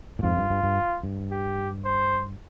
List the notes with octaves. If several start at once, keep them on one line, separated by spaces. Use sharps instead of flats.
A#2
F2 G#2 F4
G2
G2
G2
G2
G4
C5